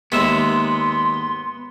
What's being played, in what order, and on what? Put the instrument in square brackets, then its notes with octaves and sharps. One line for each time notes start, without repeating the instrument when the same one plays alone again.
[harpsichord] D#2 G#3 [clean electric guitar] B3 E5 [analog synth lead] C6